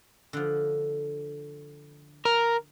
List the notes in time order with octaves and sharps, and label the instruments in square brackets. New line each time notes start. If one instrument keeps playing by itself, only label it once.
[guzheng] D3 F3
[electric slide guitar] A#4